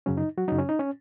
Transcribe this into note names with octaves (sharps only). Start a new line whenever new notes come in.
F#2 C#3 F#3 C#4
D#4
F#3 F#4
F#2 C#3 F#3 D#4
C#4
D#4
C#4